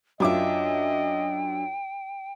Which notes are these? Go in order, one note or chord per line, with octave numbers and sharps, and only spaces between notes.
F#2 D4 F4 D#5 E5 G5 D6